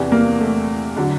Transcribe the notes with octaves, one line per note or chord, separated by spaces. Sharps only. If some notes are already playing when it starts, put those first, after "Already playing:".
Already playing: E2 C3 E3 D4
A#3
A3
D3 F#3